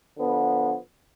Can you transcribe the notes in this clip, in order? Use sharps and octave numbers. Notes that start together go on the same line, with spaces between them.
D3 F3 B3